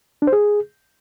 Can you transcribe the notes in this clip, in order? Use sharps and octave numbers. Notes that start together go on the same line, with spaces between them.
D4
C5
G#4